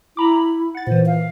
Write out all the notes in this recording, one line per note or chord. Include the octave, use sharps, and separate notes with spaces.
E4 A#5 B5 D6
B5
F#5 A6
A#2 E3 C5
F5